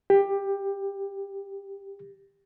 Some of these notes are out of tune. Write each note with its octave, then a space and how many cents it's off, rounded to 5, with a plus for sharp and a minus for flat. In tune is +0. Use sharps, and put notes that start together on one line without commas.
G4 +15